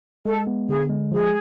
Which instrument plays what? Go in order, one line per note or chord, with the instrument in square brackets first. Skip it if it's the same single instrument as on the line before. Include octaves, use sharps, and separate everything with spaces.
[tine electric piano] G#3 [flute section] A4
[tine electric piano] B3
[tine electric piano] D3 [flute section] G#4
[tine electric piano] G#3
[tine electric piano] F3 [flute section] G#4